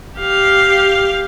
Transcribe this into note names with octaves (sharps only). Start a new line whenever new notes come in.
G4 F5